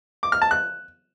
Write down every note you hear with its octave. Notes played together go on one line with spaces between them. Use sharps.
D6
F6
A5
F#6